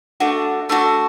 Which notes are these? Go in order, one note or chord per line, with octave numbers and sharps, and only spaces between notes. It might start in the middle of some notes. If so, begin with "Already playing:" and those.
A3 D4 F#4
A3 D4 F#4